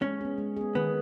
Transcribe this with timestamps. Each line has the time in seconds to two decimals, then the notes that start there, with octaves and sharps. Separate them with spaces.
0.02 G#3 C#4
0.21 B3 G#4
0.38 G#3
0.56 B3 G#4
0.75 D#3 B3